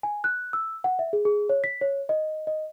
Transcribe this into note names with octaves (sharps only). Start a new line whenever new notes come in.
G#5
F#6
E6
F#5
E5
G#4
G#4
C#5
B6
C#5
D#5
D#5